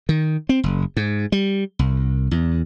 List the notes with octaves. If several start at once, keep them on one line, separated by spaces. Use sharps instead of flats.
D#3
C4
F#1
G#2
G3
C2
E2